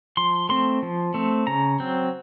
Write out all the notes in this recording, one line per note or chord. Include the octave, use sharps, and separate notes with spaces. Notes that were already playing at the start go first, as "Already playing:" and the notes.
F3 C6
A3 C4 C6
F3
A3 C4
C#3 A#5
F#3 C4